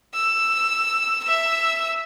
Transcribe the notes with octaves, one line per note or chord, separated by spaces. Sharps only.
E6
E5 E6